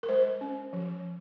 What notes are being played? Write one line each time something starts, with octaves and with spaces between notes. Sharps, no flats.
A#4
G#3 C5
C#4
F3